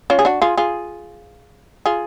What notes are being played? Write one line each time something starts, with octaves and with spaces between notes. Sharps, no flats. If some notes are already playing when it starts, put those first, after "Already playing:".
C#4 F4
G#4
D4 F#4
F4 G#4
F4 G#4
F4 G#4